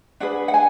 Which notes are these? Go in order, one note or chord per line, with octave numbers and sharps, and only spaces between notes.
D4 G#4 B4 F#5
F#5
G#5